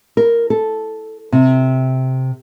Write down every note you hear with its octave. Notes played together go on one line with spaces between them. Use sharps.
A#4
A4
C3